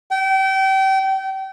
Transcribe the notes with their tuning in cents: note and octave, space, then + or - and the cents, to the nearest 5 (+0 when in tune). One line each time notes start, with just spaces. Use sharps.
G5 -30